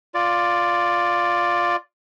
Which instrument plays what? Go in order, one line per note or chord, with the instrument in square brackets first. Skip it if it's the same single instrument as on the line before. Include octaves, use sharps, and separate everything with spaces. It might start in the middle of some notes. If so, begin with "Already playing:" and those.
[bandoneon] F4 D5